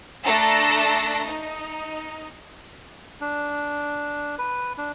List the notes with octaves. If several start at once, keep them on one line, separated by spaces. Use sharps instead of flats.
A3 D4 A4 A5 A#5 A#6
D#4
D4
B4
D4